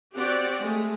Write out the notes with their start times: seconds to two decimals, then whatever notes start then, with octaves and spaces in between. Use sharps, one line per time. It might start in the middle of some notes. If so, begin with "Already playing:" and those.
0.16 C4 F#4 G4 D5 F#5
0.60 G#3 A3